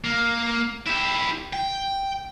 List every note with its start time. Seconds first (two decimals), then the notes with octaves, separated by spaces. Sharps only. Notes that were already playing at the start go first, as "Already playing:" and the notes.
0.04 A#3
0.87 E4 G4
1.53 G5